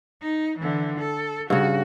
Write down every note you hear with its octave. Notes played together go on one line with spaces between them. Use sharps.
D#4
D3 E3
A4
G2 C#3 F#4